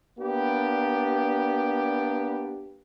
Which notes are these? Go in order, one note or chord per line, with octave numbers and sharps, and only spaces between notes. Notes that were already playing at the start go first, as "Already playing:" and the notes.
A#3 B3 D4 G4